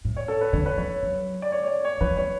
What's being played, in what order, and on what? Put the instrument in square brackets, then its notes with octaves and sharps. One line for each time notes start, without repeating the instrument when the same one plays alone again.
[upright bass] A2
[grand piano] C#5
A4
B4
[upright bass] D3 [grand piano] C#5
[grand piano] B4
[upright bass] E3 [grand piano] C#5
[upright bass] F#3
[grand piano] D5
C#5
C#5
D5
C#5
[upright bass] E3 [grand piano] B4
[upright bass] F#3 [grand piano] C#5